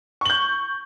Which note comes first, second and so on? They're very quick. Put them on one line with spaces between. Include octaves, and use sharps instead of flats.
C#6 F#7 G6